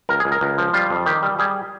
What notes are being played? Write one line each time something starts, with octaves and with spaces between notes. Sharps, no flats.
C#2 A#4
G#4
C#2
A#4
C#2
F3
G3 F4
F2
D#3 G4
G3
G3 G#4